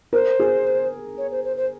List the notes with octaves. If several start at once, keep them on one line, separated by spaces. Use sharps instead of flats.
A#4 C5
G#4
C#5
C5
C5
C5